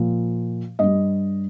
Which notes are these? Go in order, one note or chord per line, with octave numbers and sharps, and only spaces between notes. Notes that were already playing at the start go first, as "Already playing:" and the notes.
Already playing: A#2 F3
G2 G3 D#5